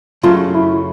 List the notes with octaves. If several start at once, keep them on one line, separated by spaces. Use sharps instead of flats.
F#2 C#3 F#3 A3 F4
E4